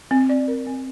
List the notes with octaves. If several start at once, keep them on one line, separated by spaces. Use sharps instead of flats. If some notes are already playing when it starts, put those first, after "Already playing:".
C4
D5
A#4
C4